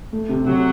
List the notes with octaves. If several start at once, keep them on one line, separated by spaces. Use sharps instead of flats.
A3
C3
C3 F#3